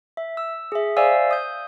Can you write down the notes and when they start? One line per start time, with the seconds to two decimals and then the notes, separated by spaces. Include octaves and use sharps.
0.17 E5
0.37 E6
0.72 G#4 E5
0.97 C5 D5 E5 F5 G#5 E6
1.31 D#6 G6